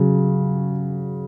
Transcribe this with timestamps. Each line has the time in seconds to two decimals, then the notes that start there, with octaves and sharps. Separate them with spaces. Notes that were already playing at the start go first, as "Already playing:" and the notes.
Already playing: C#3 F#3